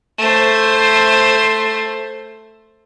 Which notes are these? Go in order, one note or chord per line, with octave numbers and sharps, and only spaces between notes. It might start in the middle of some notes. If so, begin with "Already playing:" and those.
A3 C5